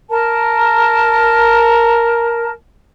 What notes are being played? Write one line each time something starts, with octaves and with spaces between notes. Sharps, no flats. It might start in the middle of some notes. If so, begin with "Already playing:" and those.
A#4 A5